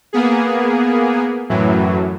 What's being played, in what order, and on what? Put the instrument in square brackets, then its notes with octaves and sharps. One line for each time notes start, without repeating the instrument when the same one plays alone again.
[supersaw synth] A#3 B3 G#4
F#2 A2 E3 F#3